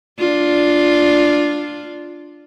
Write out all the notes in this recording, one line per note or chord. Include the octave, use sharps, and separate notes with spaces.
D4 F4